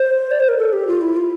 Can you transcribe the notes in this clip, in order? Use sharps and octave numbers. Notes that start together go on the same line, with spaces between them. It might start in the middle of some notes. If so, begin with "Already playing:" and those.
Already playing: C5
D5
C5
A#4
A4
G4
F4
E4
F4